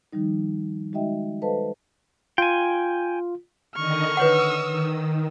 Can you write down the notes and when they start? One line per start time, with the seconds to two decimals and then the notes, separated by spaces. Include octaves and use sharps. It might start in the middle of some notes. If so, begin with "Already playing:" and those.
0.13 D#3 F3 G3 D#4
0.93 G#3 D#4 F#4 D#5 E5 G5
1.42 A4 B4 C5 D#5 F5 A5
2.38 F4 G5 G#5
3.76 D3 D#3 D#5 C#6 F6
4.17 B4 C#5 F#5 D#6 E6
4.70 D#3